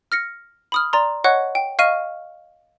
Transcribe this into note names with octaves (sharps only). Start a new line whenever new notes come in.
F6 A#6 C#7
B5 D#6 F6
D5 A#5 C6
C#5 D#5 F#5 C#6 F#6
G5
D#5 F5 C#6 F6 D#7